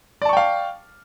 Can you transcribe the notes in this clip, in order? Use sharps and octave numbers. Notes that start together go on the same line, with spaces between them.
D5 F5 G5 A5 C#6